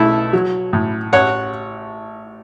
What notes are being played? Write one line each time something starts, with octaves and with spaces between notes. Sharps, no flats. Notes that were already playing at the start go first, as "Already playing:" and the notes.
Already playing: B1 A3 E4
F#3
A2
A1 C#5 F#5